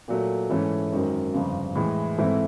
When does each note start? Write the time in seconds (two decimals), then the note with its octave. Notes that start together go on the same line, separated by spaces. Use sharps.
0.08 A#2 F#3 A3
0.50 G#2 E3 A3 C#4
0.92 G#1 F#2 D#3 F#3
1.34 G1 F2 C#3
1.75 A2 E3 G#3
2.18 G#2 E3 A3 C4 E4